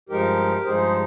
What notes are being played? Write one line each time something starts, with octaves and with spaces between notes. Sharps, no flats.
G2 F3 G#3 D#4 G4 A#4
G2 F3 G#3 D#4 G#4 C5